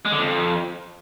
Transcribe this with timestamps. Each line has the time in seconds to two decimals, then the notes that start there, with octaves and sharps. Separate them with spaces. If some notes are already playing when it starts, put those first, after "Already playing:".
0.05 G#3
0.12 D3
0.19 F2